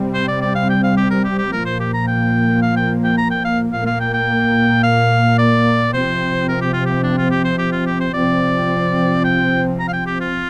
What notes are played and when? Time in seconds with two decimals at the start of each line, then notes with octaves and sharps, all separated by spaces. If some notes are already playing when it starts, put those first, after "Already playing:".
Already playing: C3 G3 C4
0.14 C5
0.28 D5
0.41 D5
0.55 F5
0.70 G5
0.83 F5
0.97 G4
1.10 A#4
1.24 G4
1.38 G4
1.52 A#2 F3 A#3 A#4
1.66 C5
1.80 G4
1.94 A#5
2.08 G5
2.62 F5
2.76 G5
3.04 G5
3.18 A#5
3.31 G5
3.45 F5
3.72 A#2 A#3 F5
3.87 F5
4.00 G5
4.14 G5
4.83 F5
5.38 D5
5.93 C3 F3 C4 C5
6.48 A#4
6.61 G4
6.73 F4
6.86 G4
7.03 D4
7.18 F4
7.31 G4
7.45 C5
7.58 G4
7.72 F4
7.87 G4
8.00 C5
8.13 C3 F3 C4 D5
9.24 G5
9.79 A#5
9.88 F5
9.93 G5
10.07 G4
10.21 F4